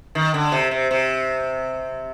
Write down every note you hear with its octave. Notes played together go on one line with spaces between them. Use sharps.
D#3
D3
C3
C3
C3